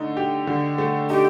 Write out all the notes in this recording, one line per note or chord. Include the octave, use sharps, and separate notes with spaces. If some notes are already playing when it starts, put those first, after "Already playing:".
Already playing: D3 A3 D#4
G4
D3
A3
D#4 G4